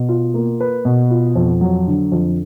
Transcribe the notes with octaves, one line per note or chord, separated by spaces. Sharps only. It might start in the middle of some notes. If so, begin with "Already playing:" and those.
Already playing: B2
F4
A#3
B4
B2
F4
F2
F#3
D3
F2